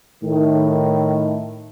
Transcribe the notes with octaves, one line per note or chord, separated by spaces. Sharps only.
A2 D#3